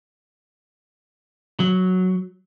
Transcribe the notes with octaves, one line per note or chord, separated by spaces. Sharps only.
F#3